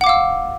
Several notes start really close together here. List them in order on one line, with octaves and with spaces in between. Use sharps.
F#5 D6 F5 E6